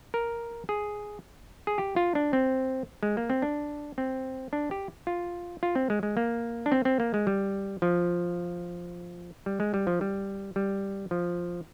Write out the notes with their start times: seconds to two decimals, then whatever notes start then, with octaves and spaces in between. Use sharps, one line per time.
0.14 A#4
0.69 G#4
1.67 G#4
1.78 G4
1.96 F4
2.15 D4
2.33 C4
3.03 G#3
3.17 A#3
3.30 C4
3.42 D4
3.98 C4
4.53 D4
4.71 G4
5.07 F4
5.63 F4
5.75 C4
5.90 G#3
6.03 G#3
6.17 A#3
6.66 D4
6.72 C4
6.85 C4
7.00 A#3
7.14 G#3
7.27 G3
7.82 F3
9.46 G3
9.60 G#3
9.74 G3
9.87 F3
10.01 G3
10.56 G3
11.11 F3